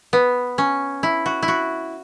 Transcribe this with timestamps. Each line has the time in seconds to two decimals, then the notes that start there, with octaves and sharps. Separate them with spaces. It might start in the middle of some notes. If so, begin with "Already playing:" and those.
0.13 B3
0.58 C#4
1.03 E4
1.26 F#4
1.42 E4
1.48 F#4